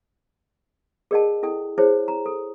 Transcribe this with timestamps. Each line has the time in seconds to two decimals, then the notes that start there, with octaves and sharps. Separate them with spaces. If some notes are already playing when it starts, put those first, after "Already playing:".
1.11 G#4 A#4 D5 D#5 F#5 A5
1.43 E4 A4 G5
1.78 E4 G#4 C5 C#5
2.08 A#5
2.26 A4